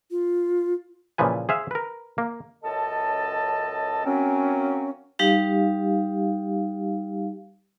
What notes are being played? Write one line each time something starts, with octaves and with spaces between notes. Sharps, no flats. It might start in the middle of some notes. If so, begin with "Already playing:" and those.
F4
A#2 C#3 E3 F3 B4 G#5
G#4 C5 E5 F5
A#4 B4
A#3
C#2 F#2 A4 D#5 A5
F#3 A#3 C4 C#4
G3 D#4 G4 F5